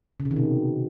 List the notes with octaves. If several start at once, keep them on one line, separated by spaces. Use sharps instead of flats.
C#3
C3
D#3
B2